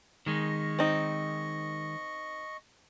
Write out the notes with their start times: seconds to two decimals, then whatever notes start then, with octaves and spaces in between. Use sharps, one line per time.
0.26 D#3 G#3 D#5 C#6
0.79 C4 D#4